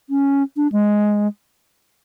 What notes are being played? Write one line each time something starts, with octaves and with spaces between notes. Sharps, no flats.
C#4
D4
G#3